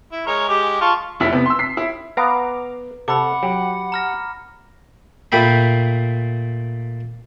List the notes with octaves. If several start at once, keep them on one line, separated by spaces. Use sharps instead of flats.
E4
G#3 A#4 C#5
G#3 G4
F4 A5 C#6
F1 E4 B6
C3 B3
C6 E6
B6 C7
E4
B3 F5 A#5 D6
C3 A4 F#5 B5 D6
F#3 G4
A#5 F6 A#6
A#2 A3 A#3 G5 B5